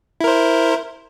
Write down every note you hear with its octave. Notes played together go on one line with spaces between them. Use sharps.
E4 A#4 C5